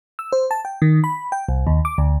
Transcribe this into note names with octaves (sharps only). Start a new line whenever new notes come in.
E6
C5
A5
G5
D#3
B5
G5
C2
D#2
D6
D2